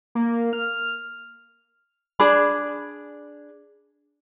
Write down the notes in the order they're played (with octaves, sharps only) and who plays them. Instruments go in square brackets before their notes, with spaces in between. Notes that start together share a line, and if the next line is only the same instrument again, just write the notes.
[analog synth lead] A#3
F6
[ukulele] D4 G#4 B5